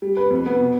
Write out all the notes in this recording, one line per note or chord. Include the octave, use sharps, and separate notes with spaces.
G3
B4
F2
B3
B2